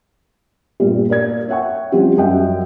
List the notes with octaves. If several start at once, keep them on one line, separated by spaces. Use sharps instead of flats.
G2 A#2 G3
A#3 D5 G#6
C#5 E5 F#5 G5 C#6
F3 G3 C4 C#4 F#4 G4
F#2 G3 D#5 E5 F#5 G5